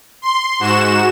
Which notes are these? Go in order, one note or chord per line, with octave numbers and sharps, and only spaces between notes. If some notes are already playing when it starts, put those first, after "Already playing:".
C6
G#2 F#4 E7